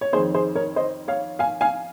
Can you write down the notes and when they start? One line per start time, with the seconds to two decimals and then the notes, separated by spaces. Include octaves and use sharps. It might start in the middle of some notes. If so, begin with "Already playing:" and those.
0.01 C#5
0.13 D#3 G#4 C5
0.16 F2
0.35 G#4 C5
0.55 A#4 C#5
0.76 C5 D#5
1.08 C#5 F5
1.39 F5 G#5
1.61 F5 G#5